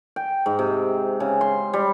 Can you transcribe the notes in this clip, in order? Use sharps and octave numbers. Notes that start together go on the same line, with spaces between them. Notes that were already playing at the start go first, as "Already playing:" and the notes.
G5
G#2
C3
C#3
C6
G3